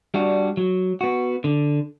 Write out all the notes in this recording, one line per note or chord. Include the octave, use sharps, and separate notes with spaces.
G3 D4 F#4
F#3
B3 F#4
D3